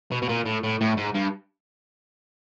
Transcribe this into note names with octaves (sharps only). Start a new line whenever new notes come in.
B2
B2
A#2
A2
A2
A2
G#2
G2